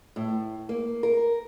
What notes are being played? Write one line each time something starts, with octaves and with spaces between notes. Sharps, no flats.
A2
A#3
A#4